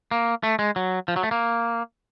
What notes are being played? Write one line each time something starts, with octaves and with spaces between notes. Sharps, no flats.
A#3
A3
G#3
F#3
F3
F#3
A3
A#3